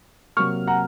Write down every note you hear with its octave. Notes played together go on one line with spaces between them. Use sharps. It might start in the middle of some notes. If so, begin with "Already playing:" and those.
C3 F#3 A#3 C#6 F6
F#5 A#5